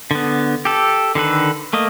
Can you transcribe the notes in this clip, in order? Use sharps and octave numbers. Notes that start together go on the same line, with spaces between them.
D3 B3
G4 A4
D3 D#3 A4 B4
A3 A#3 D#5